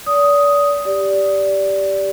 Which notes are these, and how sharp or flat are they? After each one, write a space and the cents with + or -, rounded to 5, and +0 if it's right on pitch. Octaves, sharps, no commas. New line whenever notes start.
D5 -35 D#6 +5
G4 +0 D5 -15